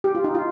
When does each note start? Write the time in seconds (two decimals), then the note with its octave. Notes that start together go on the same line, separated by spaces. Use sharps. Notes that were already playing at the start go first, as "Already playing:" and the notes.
0.04 G4
0.15 F4
0.24 D#4
0.35 F4